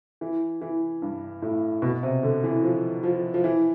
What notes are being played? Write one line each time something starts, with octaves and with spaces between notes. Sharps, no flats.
E3
E3
G2
A2
B2
C3
D3
E3
F3
F3
F3
E3